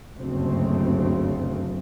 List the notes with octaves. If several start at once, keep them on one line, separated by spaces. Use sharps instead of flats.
F#1 D2 G2 C#3 C4